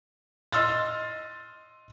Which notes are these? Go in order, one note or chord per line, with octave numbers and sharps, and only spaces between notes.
D#5 C6 E6 F6 A6